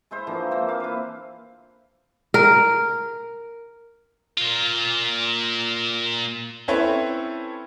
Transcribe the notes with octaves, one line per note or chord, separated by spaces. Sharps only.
G#3 E4 C5
D3 E3 F3 A#3
E3 A#3 C4 C5
F5
E4 B4
A#4
A#2 F4
C4 C#4 E4 A4 B4 C#5